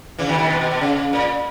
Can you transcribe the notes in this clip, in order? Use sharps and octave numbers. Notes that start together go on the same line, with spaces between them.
C#3 E3
B2 D#3
B2 D#3
B2
B2
B2
C#3
A#2